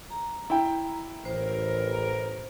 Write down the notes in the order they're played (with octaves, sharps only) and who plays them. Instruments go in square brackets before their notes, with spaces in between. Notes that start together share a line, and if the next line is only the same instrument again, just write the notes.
[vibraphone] A#5
[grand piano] E4 G5
[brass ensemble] A1 A#4 [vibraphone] C5